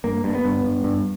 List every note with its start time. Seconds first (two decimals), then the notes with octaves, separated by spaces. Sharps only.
0.04 G2 A#3
0.24 G2
0.35 B3
0.45 G2
0.64 G2
0.84 G2